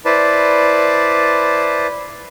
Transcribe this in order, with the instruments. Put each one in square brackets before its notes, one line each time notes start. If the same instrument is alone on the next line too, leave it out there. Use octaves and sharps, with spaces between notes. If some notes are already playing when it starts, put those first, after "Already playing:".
[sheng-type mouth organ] E4 B4 C5 D5 A5